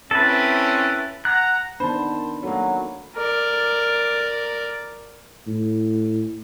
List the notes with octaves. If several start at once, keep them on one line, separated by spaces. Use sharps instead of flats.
C4 C#4 E4 A4 B4
F#5 A#5 F#6
D#3 B3 D4 C5 A5 B5
F#3 A3 A#3
A#4 D5
A2